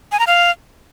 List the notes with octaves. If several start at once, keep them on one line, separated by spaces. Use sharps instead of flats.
G#5
A#5
F5